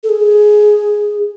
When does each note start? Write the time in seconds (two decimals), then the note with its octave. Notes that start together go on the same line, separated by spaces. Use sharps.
0.03 A4
0.09 G#4